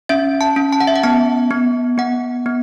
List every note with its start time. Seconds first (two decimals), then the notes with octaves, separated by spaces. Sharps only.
0.09 C#4 E5
0.41 A5
0.56 C#4
0.73 A5
0.80 F#5
0.87 E5
0.96 F#5
1.03 B3 A5
1.51 B3
1.98 B3 F#5
2.46 B3